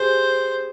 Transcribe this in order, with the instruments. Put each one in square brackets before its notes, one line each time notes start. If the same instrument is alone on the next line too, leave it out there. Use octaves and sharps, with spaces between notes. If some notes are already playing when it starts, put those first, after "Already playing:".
Already playing: [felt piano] G4 G#4 [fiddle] C5